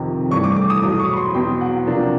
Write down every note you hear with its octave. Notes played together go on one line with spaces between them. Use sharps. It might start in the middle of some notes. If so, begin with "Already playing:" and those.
Already playing: F2 C3 D#3
G2 E3 A3 C#6
D6
D6
D#6
E2 B2 F#3 D#6
C#6
B5
C6
E2 B2 F#3 B3 G5
F#5
C3 F3 A#3 D4